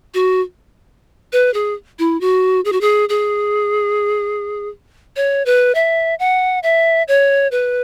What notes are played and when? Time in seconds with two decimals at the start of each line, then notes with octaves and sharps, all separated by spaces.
0.14 F#4
1.33 B4
1.54 G#4
1.99 E4
2.21 F#4
2.65 G#4
2.72 F#4
2.81 G#4
3.09 G#4
5.16 C#5
5.46 B4
5.75 E5
6.19 F#5
6.63 E5
7.08 C#5
7.52 B4